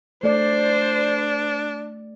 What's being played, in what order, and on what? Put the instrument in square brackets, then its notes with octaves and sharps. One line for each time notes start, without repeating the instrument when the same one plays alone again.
[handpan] A3 D5 [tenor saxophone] D4 [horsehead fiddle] C5